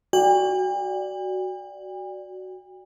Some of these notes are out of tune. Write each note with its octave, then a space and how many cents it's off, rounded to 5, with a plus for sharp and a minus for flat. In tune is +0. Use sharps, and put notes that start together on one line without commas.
F#4 +10 D5 +0 G5 +45